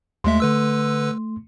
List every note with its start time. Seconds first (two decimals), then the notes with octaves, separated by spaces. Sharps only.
0.24 D#2 G#3 A3 E5 C6
0.40 D3 B4 E6